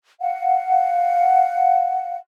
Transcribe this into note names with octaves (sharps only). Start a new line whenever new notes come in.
F5 F#5